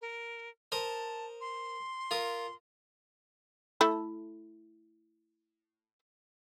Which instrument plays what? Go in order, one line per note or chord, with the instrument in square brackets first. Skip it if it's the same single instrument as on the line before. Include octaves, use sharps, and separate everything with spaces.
[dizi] A#4
[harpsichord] A#4 C5 D#6 [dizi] A5
[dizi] C6
[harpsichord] F4 A#4 D#6
[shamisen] A3 E4 A4